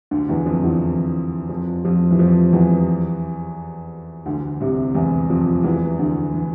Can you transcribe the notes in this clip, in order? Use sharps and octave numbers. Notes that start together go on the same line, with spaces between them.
D2 D3
E2 E3
F2 F3
E2 E3
F2 F3
F2 F3
E3
F2 F3
E2 E3
D2 D3
C2 C3
E2 E3
F2 F3
E2 E3
D2 D3
E3